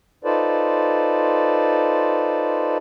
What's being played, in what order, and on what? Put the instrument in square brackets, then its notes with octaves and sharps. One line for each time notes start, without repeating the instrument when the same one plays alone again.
[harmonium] D#4 F4 A4 B4 C5 D5